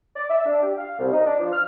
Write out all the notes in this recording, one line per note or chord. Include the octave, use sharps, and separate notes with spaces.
D5
E5
D4
G4
F5
C2
D#4
D4
F3
F6